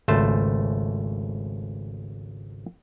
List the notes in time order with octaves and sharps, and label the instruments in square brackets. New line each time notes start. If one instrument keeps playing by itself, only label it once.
[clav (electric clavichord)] G#1 C#2 A3 C5 A5